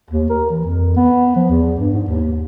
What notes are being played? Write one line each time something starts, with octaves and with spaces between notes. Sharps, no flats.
D#2
A#4
E3
F2
B3
F3
E2
G2
G#2
D#2